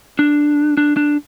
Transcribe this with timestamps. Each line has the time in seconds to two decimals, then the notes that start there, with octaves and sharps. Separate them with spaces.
0.19 D4
0.77 D4
0.97 D4